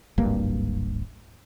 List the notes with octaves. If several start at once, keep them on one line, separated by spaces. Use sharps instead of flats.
D1 G#1 G2 A#3